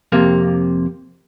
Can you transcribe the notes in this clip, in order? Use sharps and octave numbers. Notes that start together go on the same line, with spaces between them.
F2 C3 A#3